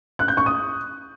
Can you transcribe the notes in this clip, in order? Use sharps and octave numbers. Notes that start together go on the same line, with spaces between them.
F#6
G6
C#6
D#6